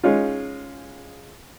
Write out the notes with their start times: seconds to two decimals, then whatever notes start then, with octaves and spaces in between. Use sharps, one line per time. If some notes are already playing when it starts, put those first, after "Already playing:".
0.03 G#3 C#4 D#4 F4